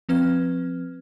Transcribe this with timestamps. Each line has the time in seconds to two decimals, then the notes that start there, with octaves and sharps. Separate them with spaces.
0.09 F3 C4 B4 F6 G#6